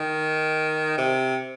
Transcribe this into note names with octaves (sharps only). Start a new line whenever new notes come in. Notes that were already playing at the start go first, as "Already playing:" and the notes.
Already playing: D#3
C3